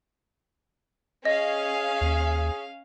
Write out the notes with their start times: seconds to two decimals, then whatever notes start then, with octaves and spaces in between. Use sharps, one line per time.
1.25 C#4 G#4 D#5 F5
2.01 D#2